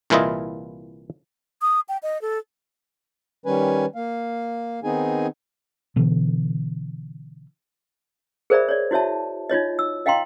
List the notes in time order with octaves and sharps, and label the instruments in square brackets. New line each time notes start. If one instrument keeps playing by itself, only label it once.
[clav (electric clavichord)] C2 A#2 E3 E4 F4 D#5
[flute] D#6
G5
D#5
A4
[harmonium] D#3 G3 C#4 B4 G#5
A#3 F5
D#3 B3 C4 D#4 G#4 G#5
[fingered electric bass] B2 D3 E3
[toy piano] G#4 A#4 C5 D5 E5 B5
C#5 D5
E4 F#4 C#5 E5 A5
D#4 F4 C#5 D#5
E6
D#5 F5 G5 A#5 C6